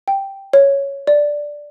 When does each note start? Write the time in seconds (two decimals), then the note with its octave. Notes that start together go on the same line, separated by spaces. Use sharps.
0.08 G5
0.53 C#5
1.07 D5